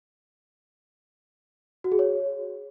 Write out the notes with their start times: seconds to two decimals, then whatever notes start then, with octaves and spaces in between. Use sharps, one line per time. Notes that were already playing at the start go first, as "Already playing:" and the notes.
1.84 F#4
1.92 G#4
1.99 C#5